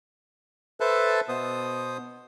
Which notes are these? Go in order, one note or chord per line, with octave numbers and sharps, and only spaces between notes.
A4 B4 C5 E5 A5
B2 B3 C5 D#6